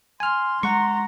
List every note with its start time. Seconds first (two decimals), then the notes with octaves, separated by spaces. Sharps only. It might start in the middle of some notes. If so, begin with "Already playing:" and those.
0.20 G#5 C6 F6
0.63 G#3 F#5 A#5 C#6